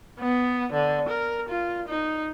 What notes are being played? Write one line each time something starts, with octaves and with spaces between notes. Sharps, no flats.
B3
D3
A#4
F4
D#4